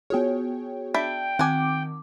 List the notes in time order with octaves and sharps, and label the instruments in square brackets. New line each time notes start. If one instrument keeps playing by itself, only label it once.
[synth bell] B3 F#4 G#4 [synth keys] C#5 G5
[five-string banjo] D4 E5 B5 [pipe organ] G5
[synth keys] D#3 [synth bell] C4 D6 [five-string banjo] F#5 G#5